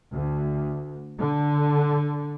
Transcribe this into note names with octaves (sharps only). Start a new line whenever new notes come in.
D2
D3